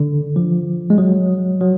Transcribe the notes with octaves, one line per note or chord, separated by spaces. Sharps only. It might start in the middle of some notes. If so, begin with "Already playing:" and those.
Already playing: D3
F3
G#3
F#3
F#3